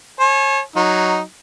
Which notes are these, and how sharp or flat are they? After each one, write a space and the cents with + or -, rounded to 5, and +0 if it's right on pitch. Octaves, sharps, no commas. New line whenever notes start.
C#5 -35 G#5 +40
F#3 +0 D#4 +0